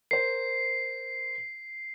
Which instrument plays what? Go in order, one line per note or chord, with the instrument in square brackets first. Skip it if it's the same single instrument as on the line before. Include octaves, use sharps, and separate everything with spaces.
[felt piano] A#4 C5 [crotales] C7